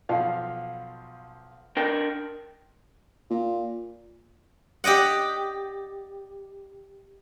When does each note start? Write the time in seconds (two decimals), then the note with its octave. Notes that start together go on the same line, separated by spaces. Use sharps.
0.09 B1 F3 F5
1.77 D4 A#4 G5
3.30 A#2
4.84 G4 D5 D#5 F#5